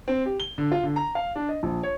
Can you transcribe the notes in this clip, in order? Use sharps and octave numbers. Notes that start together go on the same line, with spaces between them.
C4
G4
G7
D3
F4
D3
A#5
F5
D4
D#5
A#1
C#5